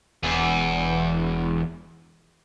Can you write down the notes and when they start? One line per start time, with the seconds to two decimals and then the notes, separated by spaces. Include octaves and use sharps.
0.23 E1 E2